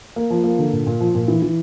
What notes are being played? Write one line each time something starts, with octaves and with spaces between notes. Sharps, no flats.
A#3
F3
A#3
D3
A#2
A#2
F3
A#2
E3
E3